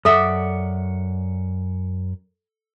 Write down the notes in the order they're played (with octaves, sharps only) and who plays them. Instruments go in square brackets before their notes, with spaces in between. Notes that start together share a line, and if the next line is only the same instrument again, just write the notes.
[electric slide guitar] F#2 F#5 [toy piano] A4 [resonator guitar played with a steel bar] D5 E5